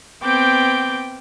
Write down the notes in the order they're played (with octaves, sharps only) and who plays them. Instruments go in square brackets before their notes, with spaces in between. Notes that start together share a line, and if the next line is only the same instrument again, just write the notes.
[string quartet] B3 C4 G5 D6 G6